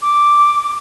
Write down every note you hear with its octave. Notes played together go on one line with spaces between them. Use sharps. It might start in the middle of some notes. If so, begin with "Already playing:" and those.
D6